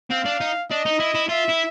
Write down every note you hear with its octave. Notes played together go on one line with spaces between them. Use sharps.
C4 F5
D4
D#4
D4 D#5
D#4
E4
E4
F4 E5
E4